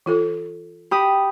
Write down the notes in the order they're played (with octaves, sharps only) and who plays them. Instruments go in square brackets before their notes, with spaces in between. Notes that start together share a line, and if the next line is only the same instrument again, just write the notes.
[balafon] E3 F4 A4
[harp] G4 B5 D#6